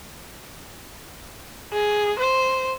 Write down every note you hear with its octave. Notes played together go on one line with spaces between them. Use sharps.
G#4
C5